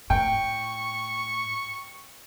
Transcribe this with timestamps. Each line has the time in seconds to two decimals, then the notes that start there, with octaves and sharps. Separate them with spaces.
0.10 A2 G5 C#6